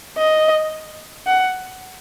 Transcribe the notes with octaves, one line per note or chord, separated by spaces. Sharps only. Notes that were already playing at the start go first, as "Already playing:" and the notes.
D#5
F#5